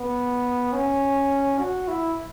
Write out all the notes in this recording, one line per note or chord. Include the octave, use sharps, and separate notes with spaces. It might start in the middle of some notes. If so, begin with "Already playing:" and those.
Already playing: B3
C#4
F#4
E4